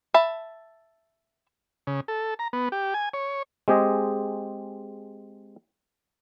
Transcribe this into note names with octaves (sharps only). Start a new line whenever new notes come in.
E5 A5 B5
C#3
A4
A#5
B3
G4
G#5
C#5
G#3 C4 G4 G#4 D#5